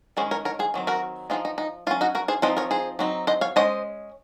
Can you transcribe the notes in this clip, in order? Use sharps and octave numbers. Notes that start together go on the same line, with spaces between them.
D#3 G#3 C#4 G#4 C5
A#4 C#5
A#4 C#5
G#4 C5
D#3 F#3 C4
F#4 A#4
F3 C4 D#4 F4 G#4
D#4
D#4
F#3 C#4 F4
D#4 F#4
F#4 A#4
G#4 C5
F3 C4 D#4 C5 D#5
A#4 C#5
G#4 C5
F#3 C4 D#4
C5 D#5
C#5 F5
G#3 C#4 C5 D#5